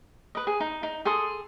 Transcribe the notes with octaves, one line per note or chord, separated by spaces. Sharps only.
B4 D#5
G#4
D#4
D#4
G#4 A4 C6 D#6